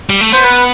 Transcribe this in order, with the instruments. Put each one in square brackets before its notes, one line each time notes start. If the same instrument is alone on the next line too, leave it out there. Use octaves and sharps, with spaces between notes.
[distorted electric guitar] G3
A3
[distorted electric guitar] B3 [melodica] C5
[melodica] B4